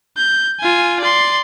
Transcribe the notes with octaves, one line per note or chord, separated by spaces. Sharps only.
G6
F4 G#5
D5 C6